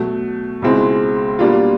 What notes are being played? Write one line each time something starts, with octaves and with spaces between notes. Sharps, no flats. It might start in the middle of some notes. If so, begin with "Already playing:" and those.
Already playing: B2 F#3 A3
C#2 B2 G#3 C4 E4
B2 G3 A#3 D4 F4